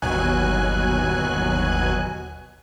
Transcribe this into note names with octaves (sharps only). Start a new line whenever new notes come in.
G1 D#2 B2 F#3 G#5 F#6